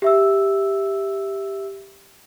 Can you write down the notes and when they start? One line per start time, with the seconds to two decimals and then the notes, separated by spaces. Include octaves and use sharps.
0.02 G4 E5 E6